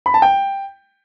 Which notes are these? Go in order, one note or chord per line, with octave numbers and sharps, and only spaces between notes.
B5
A5
G5